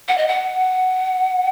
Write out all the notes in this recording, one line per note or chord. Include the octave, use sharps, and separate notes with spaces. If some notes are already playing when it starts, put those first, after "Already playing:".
F#5
D#5
F#5